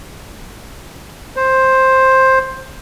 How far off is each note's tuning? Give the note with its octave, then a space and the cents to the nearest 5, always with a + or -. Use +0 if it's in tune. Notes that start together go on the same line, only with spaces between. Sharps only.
C5 +10